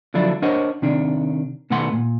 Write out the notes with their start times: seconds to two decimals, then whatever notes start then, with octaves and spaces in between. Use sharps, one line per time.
0.14 D3 F3 F#3 D4 E4 F4
0.42 D4 A#4 C5 C#5 D#5 F#5
0.82 C3 D#3 D4
1.70 B2 D#3 A3 B3 F#5 C6
1.93 A#2